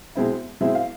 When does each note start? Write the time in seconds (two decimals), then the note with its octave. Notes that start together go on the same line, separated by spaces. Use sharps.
0.16 B2 G#3 C4 E4
0.60 B2 G#3 C4 E4 E5
0.75 F5